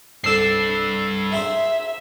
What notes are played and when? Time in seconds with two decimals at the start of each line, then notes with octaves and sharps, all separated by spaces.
0.24 C2 G2 D4 A4 E6 C7
1.32 D#4 G#4 C5 E5